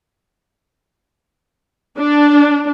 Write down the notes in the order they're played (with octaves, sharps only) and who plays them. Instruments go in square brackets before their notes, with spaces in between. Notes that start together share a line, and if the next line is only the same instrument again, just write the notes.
[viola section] D4